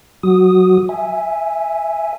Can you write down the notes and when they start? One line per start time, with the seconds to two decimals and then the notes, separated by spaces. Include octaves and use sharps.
0.23 F#3 F#4 D#6
0.89 E5 G#5